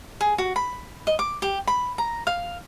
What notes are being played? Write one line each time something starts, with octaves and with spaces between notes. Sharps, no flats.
G#4
F#4
B5
D#5
D6
G4
B5
A#5
F5